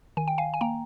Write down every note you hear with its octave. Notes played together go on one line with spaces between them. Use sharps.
D#3 G#5
G5
F5 G#5
G#5
A#3 G5 A#5